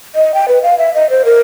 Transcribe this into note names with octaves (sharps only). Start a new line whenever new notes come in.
D#5
G5
B4
F5
E5
D#5
C5
A#4